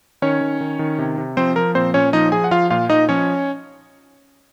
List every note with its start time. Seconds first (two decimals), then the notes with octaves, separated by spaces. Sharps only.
0.22 D#3 C#4 C#5
0.41 D#3
0.61 D#3
0.79 D#3
0.98 C3
1.18 C3
1.37 F3 C4 C5
1.56 F3 A#4
1.75 A#2 C4 C5
1.94 A#2 C#4 C#5
2.13 F3 D#4 D#5
2.32 F3 G#4 G#5
2.44 F#5
2.51 F3 F4 F5
2.70 A#2 F4 F5
2.90 A#2 D#4 D#5
3.09 F3 C#4 C#5